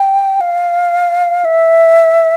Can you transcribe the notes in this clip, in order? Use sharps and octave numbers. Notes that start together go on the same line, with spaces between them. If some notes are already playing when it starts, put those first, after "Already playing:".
Already playing: G5
F5
E5